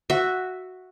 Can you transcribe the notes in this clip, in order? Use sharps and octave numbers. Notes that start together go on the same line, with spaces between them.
F#4 E5